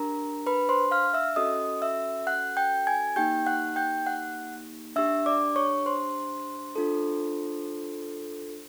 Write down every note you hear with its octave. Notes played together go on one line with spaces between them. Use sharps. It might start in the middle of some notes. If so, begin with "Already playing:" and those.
Already playing: D4 G4 A#4 A#5
B4 B5
C5 C6
F5 F6
E5 E6
C#4 F#4 A4 D#5 D#6
E5 E6
F#5 F#6
G5 G6
G#5 G#6
A#3 D#4 G4 G5 G6
F#5 F#6
G5 G6
F#5 F#6
D4 G4 E5 E6
D5 D6
C#5 C#6
C5 C6
D4 F4 A4